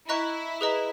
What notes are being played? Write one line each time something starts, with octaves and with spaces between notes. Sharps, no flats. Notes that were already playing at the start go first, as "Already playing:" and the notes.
E4 D#5 A#5 C#6 F#6
G#4 B4 D#5 A#5